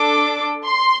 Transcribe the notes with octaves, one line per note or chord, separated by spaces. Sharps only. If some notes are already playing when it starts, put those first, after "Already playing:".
Already playing: D4 A4 D6
C6